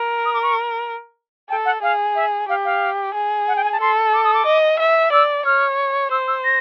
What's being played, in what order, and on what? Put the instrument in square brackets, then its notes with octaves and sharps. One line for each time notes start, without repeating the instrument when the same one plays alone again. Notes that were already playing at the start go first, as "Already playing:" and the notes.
Already playing: [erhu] A#4
[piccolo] D#6
D6
C#6
[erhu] A4 [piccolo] G5
[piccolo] F#5
[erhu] G#4 [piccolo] F5
[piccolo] E5
[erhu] G4 [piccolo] F5
[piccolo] F5
[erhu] G#4
[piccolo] F#5
G5
G#5
A5
[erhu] A4 [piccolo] C6
[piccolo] D6
D#6
D6
[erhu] D#5
E5
[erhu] D5 [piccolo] E6
[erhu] C#5 [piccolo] F6
[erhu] C5 [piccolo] E6
[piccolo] E6
A#6